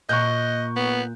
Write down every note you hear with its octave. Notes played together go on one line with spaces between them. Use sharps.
A#2 D#5 C#6 F#6 G6
B3